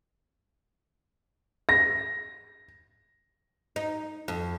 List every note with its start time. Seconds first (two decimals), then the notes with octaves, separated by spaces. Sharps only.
1.69 A#6
3.76 D#4
4.28 F2